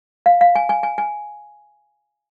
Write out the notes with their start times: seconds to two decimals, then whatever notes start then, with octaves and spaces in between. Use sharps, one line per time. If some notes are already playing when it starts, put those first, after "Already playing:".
0.26 F5
0.41 F5
0.55 G#5
0.69 G#5
0.83 G#5
0.98 G#5